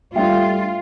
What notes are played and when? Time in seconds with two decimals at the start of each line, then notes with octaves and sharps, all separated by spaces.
0.16 G3 A3 D4 F4 E5 G5